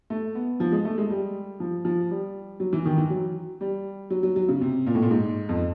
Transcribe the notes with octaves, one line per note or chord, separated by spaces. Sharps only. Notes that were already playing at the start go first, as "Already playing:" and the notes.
A3
B3
F3
G#3
A3
G#3
G3
F3
F3
G3
F#3
E3
D#3
E3
F#3
G3
F#3
F#3
F#3
C#3
C3
A#2
A2
A#2
G#2
F2